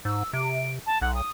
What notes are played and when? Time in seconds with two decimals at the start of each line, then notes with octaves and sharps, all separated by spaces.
0.05 G#2 E6
0.33 C3 D7
0.86 A5
1.02 B1 F#5
1.15 D#6